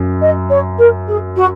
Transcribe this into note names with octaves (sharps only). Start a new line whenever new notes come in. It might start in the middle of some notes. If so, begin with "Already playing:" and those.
Already playing: F#2
D#5
C#5
A#4
G#4
F#4